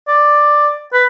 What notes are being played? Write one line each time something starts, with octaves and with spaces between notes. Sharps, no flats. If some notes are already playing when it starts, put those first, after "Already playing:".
D5
B4